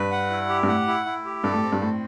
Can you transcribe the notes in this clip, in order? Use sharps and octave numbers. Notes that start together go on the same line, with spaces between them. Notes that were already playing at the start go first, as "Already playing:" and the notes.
Already playing: G2 B4
F#5
E4
G4
G2
A2 F#5
E4
E4
G4
G2 A4
A2
C4
G2
A2 C4